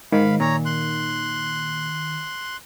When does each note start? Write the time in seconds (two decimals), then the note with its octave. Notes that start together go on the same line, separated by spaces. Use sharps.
0.12 G#2 D#3 F5 B5
0.40 A#2 C#5 A#5
0.65 C6 F#6